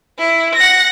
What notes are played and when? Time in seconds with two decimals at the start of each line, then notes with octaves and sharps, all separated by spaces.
0.19 E4
0.55 F#5 A#6